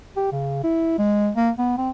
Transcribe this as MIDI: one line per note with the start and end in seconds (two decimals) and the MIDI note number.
0.17 0.32 67
0.32 0.60 49
0.64 0.94 64
0.98 1.30 56
1.36 1.51 58
1.58 1.77 59
1.78 1.90 60